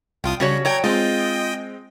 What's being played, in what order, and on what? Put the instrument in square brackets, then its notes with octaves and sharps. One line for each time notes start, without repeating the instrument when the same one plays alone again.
[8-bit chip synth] C2 F4 D#6 [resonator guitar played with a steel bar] G5
[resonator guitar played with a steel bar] C#3 F#4 C#5 [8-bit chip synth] G3
[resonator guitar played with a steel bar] F#3 C#5 G5 [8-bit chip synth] A#5 G6 G#6
[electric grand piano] G#3 C4 [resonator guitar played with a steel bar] F4 [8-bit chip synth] D#5 G5